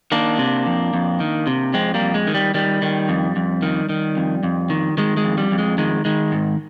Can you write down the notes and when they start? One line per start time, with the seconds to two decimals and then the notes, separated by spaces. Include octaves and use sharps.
0.12 D#3 A#3 D4
0.39 C3
0.66 F2
0.94 F2
1.20 D#3
1.47 C3
1.74 F2 G#3 C4
1.94 G3 A#3
2.01 F2
2.14 G#3
2.27 D#3
2.34 G3
2.54 D#3 G3
2.82 D#3
3.09 F2
3.36 F2
3.62 D#3
3.89 D#3
4.17 F2
4.43 F2
4.70 D#3
4.98 D#3 G#3
5.17 G#3
5.24 F2
5.38 G3
5.51 F2
5.58 G#3
5.78 D#3 G#3
6.05 D#3 G#3
6.32 G#2